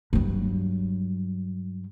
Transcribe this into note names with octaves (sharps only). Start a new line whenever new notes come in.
G2 F#3